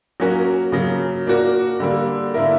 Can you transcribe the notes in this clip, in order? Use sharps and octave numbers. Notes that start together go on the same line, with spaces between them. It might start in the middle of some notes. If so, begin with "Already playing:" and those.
F#3 A#3 C#4 F#4 A#4
C#3 F#3 A#3
A#3 D4 F#4 A#4
D3 G3 A#3
D3 A#3 E4 A#4